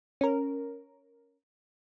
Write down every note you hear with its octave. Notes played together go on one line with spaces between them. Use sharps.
C#4 A#4